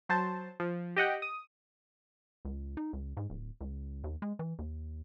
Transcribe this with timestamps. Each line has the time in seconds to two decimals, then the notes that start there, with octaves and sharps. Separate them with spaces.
0.09 F#3 C5 A5
0.60 F3
0.96 G4 D#5 F#5 G5
1.22 D#6
2.45 C#2
2.77 D#4
2.93 C#2
3.17 G#2
3.30 D1
3.61 C#2
4.04 D#2
4.22 G#3
4.39 E3
4.59 D#2